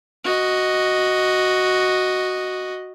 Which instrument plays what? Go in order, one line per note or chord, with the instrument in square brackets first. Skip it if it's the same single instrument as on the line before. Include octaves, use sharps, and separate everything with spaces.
[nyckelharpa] F#4 D#5